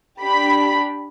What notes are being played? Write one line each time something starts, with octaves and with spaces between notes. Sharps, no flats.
D4 G4 B5